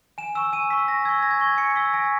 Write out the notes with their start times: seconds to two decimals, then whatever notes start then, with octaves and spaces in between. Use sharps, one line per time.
0.18 G#5 E7
0.35 C#6 E6 E7
0.53 G#5 D#7
0.70 C#6 E6 B6
0.88 G#5 A#6
1.05 C#6 E6 G#6
1.23 G#5 A#6
1.31 G#6
1.40 C#6 E6 A#6
1.58 G#5 C#7
1.75 C#6 E6 B6
1.93 G#5 A#6